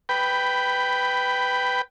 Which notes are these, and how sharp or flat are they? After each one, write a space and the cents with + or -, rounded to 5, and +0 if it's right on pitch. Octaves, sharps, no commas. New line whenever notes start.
B4 +15 G5 +0 B5 +0